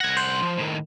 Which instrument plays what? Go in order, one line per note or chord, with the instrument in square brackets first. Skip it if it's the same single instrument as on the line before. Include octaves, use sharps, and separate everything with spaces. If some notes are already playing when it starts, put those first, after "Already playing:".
[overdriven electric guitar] C2 F#5 [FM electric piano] G#6 A#6
[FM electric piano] C5
[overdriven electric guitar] F3
A2 D#3